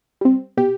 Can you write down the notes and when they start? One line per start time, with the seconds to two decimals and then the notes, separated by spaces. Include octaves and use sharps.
0.21 G3 C4
0.57 B2 G4